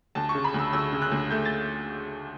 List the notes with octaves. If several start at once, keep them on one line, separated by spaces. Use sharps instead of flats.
D2 A5
C#6
C#3
B5
D2 E6
D2 E6
C#3
F#6
D2
A3 G6
A6